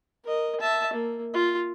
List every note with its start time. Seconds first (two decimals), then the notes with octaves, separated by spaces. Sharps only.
0.24 A#4 D#5
0.60 E5 A5
0.93 A#3
1.33 F4